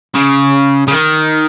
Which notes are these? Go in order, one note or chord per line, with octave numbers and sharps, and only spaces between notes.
C#3
C#3
D#3